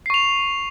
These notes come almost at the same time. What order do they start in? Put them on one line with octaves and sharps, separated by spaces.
C7 C#6 F7